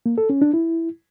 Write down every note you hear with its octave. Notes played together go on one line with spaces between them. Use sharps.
A#3
A4
C#4
D4
E4